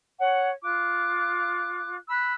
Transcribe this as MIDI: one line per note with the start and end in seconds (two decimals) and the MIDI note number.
0.19 0.49 73
0.19 0.49 78
0.62 1.95 65
0.62 1.95 86
0.62 1.95 90
2.07 2.33 83
2.07 2.33 88
2.07 2.33 90